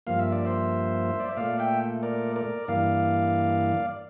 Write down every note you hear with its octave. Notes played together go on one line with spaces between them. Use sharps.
G2 F3 A#3 F5
E5
D5
C5 E5
D5
E5
A#2 A3 D5 F5
E5 G5
A#4 D5
A#4 D5
G2 E3 A#3 D5 F5